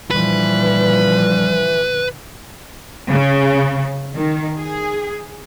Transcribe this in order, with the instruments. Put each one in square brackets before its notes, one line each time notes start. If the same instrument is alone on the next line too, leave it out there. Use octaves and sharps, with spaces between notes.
[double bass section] A#2 D3 F3 [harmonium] E3 [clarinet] G3 [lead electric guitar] B4
[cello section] C#3
D#3
G#4